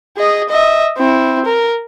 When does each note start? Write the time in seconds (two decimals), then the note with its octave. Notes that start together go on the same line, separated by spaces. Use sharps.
0.17 G#4 D#5
0.49 D#5 E5
0.98 C4 E4
1.45 A#4